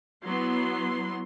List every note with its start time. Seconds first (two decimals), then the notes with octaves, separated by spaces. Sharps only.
0.23 F#3 B3 E4 C6